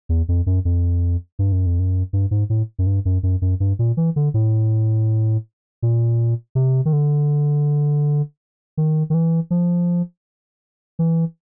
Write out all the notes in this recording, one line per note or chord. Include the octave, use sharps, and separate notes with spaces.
E2
F2
F#2
F2
G2
F#2
F2
F#2
G2
G#2
A2
F#2
G2
F#2
F#2
F#2
G2
A#2
E3
D3
A2
A#2
C3
D#3
D3
D#3
D#3
E3
F3
E3